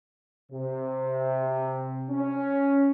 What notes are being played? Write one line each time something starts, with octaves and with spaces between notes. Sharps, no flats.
C3
C#4